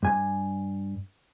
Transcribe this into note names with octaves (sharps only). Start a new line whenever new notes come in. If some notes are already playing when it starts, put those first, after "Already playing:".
G2 G#5